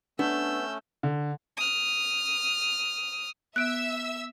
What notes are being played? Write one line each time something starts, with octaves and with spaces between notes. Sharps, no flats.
A3 B3 C#4 D4 E6 G6
D3
D#6 F6
B3 E5 E6 F#6 D7